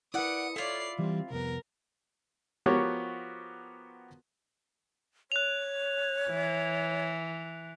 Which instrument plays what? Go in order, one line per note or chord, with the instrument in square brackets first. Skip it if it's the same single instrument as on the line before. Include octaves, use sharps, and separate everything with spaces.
[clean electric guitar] E4 A#4 B4 [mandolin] D5 F#5 [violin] D#6 C#7
[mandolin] E4 F4 [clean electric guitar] A4 C#5 [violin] D5 C7
[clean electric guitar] E3 G3 [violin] C4
[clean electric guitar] C2 F2 B3 [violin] A#4
[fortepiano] F3 B3 F#4 G4 A#4 C#5
[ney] C#5 [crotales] F#6 F7
[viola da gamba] E3